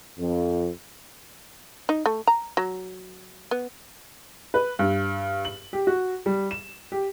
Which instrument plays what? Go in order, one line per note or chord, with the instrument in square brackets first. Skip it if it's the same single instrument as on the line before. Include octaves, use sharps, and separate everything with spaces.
[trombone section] F2
[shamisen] D#4
A3
A#5
F#3
B3
[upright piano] B4
G2
F#7
G4
F#4
G3
E7
G4